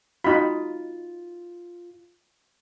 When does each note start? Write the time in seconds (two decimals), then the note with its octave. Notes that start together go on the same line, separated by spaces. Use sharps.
0.24 D#4 F4 F#4 B5